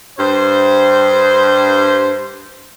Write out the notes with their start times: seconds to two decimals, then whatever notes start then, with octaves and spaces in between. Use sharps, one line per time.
0.18 G2 C5